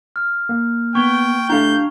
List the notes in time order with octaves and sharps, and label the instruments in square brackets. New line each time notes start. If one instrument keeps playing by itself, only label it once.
[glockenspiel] F6
[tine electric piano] A#3
[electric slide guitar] B3 [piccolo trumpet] G5 [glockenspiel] C#6 G#6 G7
[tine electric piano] A3 E4 [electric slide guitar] D4 G4 F5 [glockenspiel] A#5 [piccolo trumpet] G6